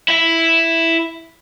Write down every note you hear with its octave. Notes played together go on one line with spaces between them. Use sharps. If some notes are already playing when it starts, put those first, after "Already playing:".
E4 E5